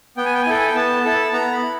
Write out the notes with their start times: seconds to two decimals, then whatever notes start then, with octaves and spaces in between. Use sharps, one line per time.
0.17 B3 G5
0.26 G#5
0.34 G5
0.42 G#5
0.46 E4 A4 G5
0.58 G#5
0.67 G5
0.75 B3 A5
1.05 E4 A4
1.33 B3 A#5
1.53 B5
1.62 E4